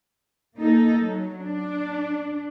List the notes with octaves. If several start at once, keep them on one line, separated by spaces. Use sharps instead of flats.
A#3 D#4 A4
F#3
D4